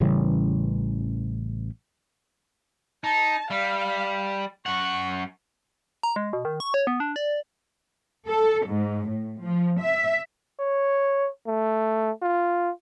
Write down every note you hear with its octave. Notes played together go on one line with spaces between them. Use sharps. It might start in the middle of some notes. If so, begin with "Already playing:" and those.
A1 C#3 E3 G3
D#4 A5
G3 F5
F#2 F#5 C#6
A#5
G#3
B2
D#3
C#6
C#5
B3
D4
D5
A4
G#2
A2
F3
E5
C#5
A3
F4